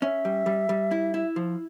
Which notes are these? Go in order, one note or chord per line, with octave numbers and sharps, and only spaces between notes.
C#4 E5
G3
G3
G3
E4
E4
F3